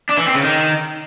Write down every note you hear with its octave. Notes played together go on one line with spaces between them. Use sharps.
D4
E3
C4
C#3
D#3